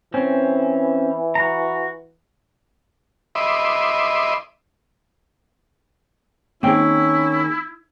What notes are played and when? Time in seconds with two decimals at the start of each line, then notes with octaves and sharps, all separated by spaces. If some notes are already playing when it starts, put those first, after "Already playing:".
0.14 E3 C4 C#4
1.35 F#4 A#5
3.35 D#5 E5 B5 C6 D6
6.63 D#3 A#3 C4 C#4 E4 G#4 G5